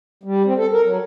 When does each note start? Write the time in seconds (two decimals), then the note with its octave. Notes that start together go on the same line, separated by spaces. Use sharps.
0.23 G3
0.46 C4
0.57 A4
0.71 A#4
0.84 F#3